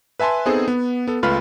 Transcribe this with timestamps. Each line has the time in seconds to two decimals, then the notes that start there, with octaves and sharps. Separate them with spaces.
0.20 B4 E5 G#5 A5 C6
0.46 B3 C4 D#4 G#4 A4 C5
0.68 B3
1.08 B3 A4
1.23 C#2 A3 F4 B4 B5 F6